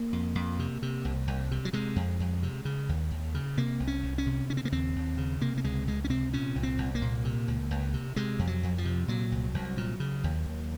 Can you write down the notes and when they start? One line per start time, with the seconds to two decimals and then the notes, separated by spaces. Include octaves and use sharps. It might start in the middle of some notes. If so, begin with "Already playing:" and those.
Already playing: A#3
0.13 F2
0.35 F2
0.59 C3
0.82 C3
1.05 C2
1.27 C2
1.51 C3
1.65 F#3
1.73 C3 G#3
1.96 F2
2.20 F2
2.43 C3
2.65 C#3
2.89 D#2
3.11 D#2
3.34 C#3
3.57 C3 A#3
3.80 C2
3.87 C#4
4.03 C2
4.18 C#4
4.26 C3
4.50 C#3 C#4
4.57 C4
4.65 A#3
4.72 D#2 C4
4.96 D#2
5.18 C#3
5.41 C3 A#3
5.58 A#3
5.64 C#2 G#3
5.87 C#2 G#3
6.04 C#4
6.09 C3 C4
6.33 A#2 C#4
6.56 C2
6.63 C4
6.78 C2
6.95 A#3
7.02 A#2
7.25 C3
7.48 C#2
7.71 C#2
7.94 C3
8.16 C3 G#3
8.39 F2
8.47 F#3
8.63 F2
8.78 F3
8.85 C3
9.08 A#2 F#3
9.32 C2
9.54 C2
9.77 A#2
10.00 C#3
10.24 D#2
10.46 D#2